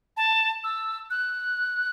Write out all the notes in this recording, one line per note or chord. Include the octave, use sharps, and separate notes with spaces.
A5
E6
F#6